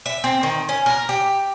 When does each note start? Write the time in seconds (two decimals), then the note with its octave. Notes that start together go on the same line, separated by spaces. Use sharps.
0.06 E5
0.24 C4
0.43 D#3
0.69 C#4
0.86 A#4
1.09 G4